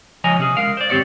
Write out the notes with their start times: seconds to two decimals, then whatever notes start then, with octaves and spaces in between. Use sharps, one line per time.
0.24 C#2 F3 C#5 D#5 G#5 A#5
0.38 C3 C#4 G#4
0.57 G#3 A#4 F5
0.77 C5 D5
0.90 D#2 G#2 C4 G4 C#5 D5